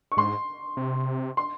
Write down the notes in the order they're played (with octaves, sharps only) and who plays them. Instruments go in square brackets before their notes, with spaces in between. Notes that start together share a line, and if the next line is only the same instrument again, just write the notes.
[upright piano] C#6
[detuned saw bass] G#2 [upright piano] C6
[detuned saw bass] C3
[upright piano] C6